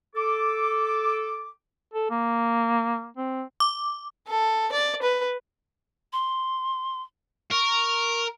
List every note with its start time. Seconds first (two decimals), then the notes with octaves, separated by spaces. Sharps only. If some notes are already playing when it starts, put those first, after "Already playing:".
0.16 A4 D6
1.94 A4
2.11 A#3
3.17 C4
3.60 D6
4.28 A4
4.72 D5
5.02 B4
6.13 C6
7.51 A#4 C#6